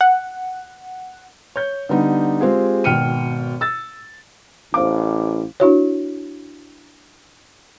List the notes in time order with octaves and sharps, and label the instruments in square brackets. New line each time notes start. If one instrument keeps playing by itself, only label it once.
[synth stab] F#5
[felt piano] C#5 G6
D3 G3 B3 D#4
G#3 C4 F4 G4 G#4
G#1 B2 G5 F6 C#7 D#7
E6 A6
[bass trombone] A1 [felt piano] C5 F5 D6
[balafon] D4 E4 F#4 C#5